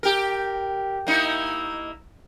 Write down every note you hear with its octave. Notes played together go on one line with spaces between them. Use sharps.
G4 A#4
A#3 D#4 E4